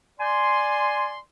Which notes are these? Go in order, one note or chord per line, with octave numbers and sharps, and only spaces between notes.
D5 G#5 C6